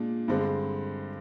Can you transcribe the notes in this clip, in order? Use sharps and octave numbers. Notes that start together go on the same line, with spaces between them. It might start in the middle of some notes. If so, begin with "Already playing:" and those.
Already playing: A#2 G#3 D4
G2 D3 G#3 C4